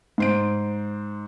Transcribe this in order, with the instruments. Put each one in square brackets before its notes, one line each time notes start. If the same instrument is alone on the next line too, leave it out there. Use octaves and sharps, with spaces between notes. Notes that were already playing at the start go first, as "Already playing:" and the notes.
[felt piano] G#2 C5 D7